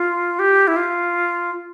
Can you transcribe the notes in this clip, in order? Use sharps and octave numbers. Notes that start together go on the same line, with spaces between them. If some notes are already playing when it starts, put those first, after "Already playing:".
Already playing: F4
G4
E4
F4